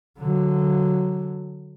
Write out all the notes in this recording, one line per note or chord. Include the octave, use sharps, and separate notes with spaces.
D3 F#3